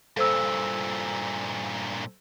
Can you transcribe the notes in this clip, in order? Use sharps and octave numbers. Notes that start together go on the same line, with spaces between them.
G2 A#2 A4 C5 E6